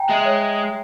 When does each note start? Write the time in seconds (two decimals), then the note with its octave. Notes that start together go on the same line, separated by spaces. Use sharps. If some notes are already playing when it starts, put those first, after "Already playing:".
Already playing: G5 G#5 A#5
0.10 G#3 E5
0.25 C#5